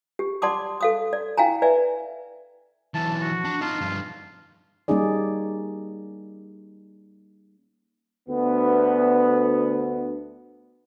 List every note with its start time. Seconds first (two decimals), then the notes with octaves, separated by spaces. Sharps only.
0.19 G4
0.42 D5 F#5 A5 C6 D6 D#6
0.81 A4 F5 D#6
1.13 D5
1.37 E4 F5 G5 G#5 A#5
1.62 B4 D5 E5 G#5
2.95 B1 E3 A5
3.21 F#4
3.45 D4
3.61 D#4 F4 A5
3.81 G2 F3
4.88 G3 A#3 C#4 D#4 G#4 D5
8.29 D2 B3